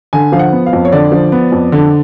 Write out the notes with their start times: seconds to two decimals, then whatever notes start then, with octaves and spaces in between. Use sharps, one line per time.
0.13 D3 G#5
0.32 F3 F5
0.39 F#5
0.52 B3
0.66 F5
0.73 F2
0.85 C#5
0.92 D3 D5
1.12 F3
1.32 B3
1.52 F2
1.72 D3